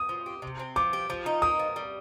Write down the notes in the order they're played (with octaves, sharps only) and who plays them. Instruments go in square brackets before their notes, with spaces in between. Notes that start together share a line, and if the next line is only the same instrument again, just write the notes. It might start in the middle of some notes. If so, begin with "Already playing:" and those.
Already playing: [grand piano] D#6
[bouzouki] F3
G4
C3
C4
[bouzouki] F3 [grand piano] D6
[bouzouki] G4
F3
D#4
[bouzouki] A#3 [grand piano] D#6
[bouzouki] F3
G3